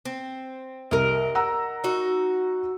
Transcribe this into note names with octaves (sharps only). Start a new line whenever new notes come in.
C4
C2 A#4 D#5
F#5 A#5 E6
D#4 F#4